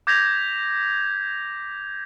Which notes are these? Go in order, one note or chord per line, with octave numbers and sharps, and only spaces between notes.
D6 G6 G#6 A#6 B6 F7